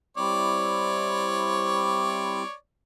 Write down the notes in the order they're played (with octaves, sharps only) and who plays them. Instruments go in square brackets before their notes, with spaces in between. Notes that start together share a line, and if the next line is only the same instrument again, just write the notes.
[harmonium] G3 C4 E4 [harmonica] C#5 D5